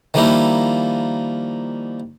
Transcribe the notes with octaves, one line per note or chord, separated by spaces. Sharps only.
D#3 F3 G3 A#3 D#4 E4